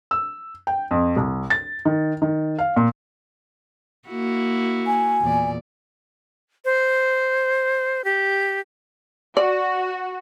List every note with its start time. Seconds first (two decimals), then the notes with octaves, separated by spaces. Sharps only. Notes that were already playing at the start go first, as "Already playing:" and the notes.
0.11 E6
0.67 G5
0.91 F2
1.16 C2
1.50 A6
1.85 D#3
2.22 D#3
2.59 F5
2.76 A#2
4.08 A#3 E4 F#4
4.87 G#5
5.21 E2 A#2 D5
6.65 C5
8.04 G4
9.37 F#4 D5